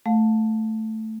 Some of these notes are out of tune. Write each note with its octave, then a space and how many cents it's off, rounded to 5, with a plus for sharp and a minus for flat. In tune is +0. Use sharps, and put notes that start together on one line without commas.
A3 +0 F5 +30